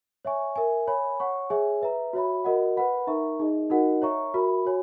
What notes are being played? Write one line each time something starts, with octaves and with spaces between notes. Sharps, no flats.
C#5 E5 G#5 C#6
A#4 E5 G#5
C#5 G#5 B5
C#5 F#5 C#6
G#4 C#5 E5 G#5
B4 E5 A#5
F#4 C#5 E5 B5
F#4 A#4 D#5 F#5
B4 F#5 B5
D#4 A#4 E5 A#5 C#6
D#4 G#4 D#5
D#4 F#4 A#4 D#5 F#5
C#5 E5 A#5 C#6
F#4 A#4 E5 B5
F#4 C#5 G#5